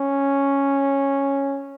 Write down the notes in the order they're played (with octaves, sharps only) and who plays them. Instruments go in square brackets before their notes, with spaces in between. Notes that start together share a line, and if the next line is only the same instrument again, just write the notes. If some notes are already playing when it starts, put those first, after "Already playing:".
Already playing: [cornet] C#4